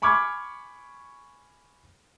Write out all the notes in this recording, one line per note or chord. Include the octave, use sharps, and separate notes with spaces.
G#5 B5 C#6 D6 F6 G#6